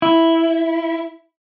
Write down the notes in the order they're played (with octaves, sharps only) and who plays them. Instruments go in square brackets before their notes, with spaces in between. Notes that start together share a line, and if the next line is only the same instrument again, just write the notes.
[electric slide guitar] E4